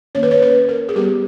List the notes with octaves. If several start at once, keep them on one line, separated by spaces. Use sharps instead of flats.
D#3 A#3 C#4 C#5
B4
C#5
B4
A#4
G#4
G3 B3 G4